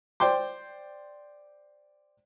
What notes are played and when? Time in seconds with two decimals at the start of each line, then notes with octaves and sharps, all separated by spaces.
0.20 C5 D5 G5 C6 D6